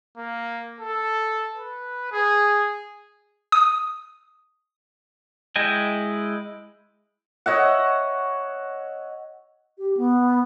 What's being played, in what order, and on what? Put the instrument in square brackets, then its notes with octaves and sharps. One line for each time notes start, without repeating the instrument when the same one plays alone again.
[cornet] A#3
A4
B4
G#4
[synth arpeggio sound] D#6
[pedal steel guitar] G#3 E4 D#5 G5 G#5
[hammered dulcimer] C#5 D#5 E5 F#5
[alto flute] G4
B3